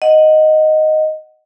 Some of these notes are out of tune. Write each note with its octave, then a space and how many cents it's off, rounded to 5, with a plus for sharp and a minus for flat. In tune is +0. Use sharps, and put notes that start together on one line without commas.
D#5 +0 F#5 +0